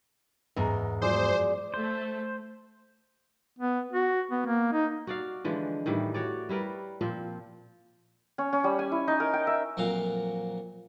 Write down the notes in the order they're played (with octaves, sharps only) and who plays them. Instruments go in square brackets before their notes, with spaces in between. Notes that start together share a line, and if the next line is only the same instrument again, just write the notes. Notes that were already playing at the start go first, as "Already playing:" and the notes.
[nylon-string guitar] E2 G#2 [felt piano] B3 A#5
[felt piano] F3 F#3 G#3 [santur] G#4 D5 [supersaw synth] C5
[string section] A3 A4 [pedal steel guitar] C5
[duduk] B3
F#4
B3
A#3
D#4
[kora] F#4 D5 F5
D3 E3 F3 G#3
A2 D#3 E3 G3
F#4 C#5 D5
G3 E4 A#4 B4
A#2 F3 C4
[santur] C#4
C#4
G3
G#5
E4
D#4
A#4
G5
E5
[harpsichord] F2 A#2 F#3 F5